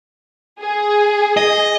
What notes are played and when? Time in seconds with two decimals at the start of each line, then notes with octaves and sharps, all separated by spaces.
0.60 G#4
1.37 D#5